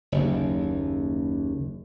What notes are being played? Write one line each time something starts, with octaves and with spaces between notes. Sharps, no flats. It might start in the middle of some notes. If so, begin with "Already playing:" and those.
F#1 D#2